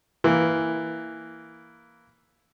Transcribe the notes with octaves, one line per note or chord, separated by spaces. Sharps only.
E3 A#3